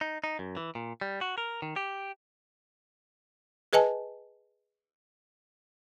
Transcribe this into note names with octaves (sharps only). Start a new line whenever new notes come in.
D#4
D#4
F#2
E3
A#2
G3
F#4
A#4
D#3
G4
G#4 B4 D#5 G#5 A5